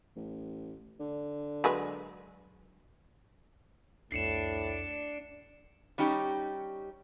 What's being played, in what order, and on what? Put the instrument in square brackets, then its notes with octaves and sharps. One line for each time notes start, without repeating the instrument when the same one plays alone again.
[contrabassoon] A1
D3
[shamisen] F#3 G#3 B4
[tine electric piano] C2 F2 [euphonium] A2 [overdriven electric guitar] D4 [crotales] C7 C#7 E7
[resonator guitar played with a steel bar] G3 C#4 D#4 G4